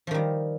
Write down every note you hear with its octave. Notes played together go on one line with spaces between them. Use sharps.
D#3 F3 G3